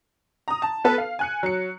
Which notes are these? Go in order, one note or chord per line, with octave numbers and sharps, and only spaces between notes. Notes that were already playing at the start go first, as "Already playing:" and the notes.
A#5 D#6
A5
B3 A4 B4 A5
F5
G#5 F#6 C#7
F#3 C#7